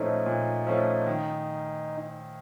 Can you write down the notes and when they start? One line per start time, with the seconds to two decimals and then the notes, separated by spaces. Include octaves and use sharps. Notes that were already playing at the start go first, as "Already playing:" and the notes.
Already playing: A#2 F3 A3 C#4 D#4
0.26 A#2
0.67 F3 A3 C#4
1.06 D#3